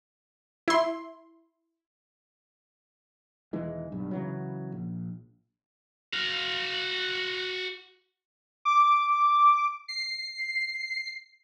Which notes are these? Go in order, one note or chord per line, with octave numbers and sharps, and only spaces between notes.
E4 C6
E1 D#3 E3 G#3
B1 G2
C#3 E3 F#3
A#1
F#4 F5
D6
C7